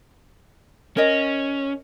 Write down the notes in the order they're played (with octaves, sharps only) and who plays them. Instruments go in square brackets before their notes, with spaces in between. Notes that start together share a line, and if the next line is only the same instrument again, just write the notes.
[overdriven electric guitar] C#4 [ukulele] A#4 D#5